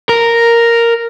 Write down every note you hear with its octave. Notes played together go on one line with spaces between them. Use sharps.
A#4